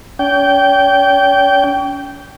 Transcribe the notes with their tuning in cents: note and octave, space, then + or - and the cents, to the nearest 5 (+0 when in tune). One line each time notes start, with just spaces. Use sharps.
C#4 +40 G5 -10